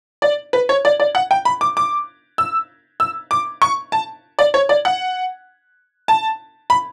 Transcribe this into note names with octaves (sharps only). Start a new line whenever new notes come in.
D5
B4
C#5
D5
D5
F#5
G5
B5
D6
D6
E6
E6
D6
C#6
A5
D5
C#5
D5
F#5
A5
B5